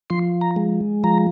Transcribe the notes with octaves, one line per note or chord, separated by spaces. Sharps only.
F3 C6
A#5
G#3
F3 A#5